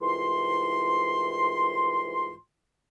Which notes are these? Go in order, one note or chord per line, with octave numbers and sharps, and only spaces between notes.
C2 G#2 E3 F4 C6